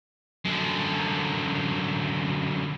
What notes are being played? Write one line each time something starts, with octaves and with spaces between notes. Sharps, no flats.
F#2 D3